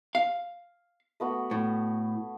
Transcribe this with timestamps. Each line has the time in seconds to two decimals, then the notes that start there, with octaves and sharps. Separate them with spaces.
0.15 F5
1.20 A3 B3 F#4
1.51 A2